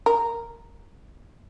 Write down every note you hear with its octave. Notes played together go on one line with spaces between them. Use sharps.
A#4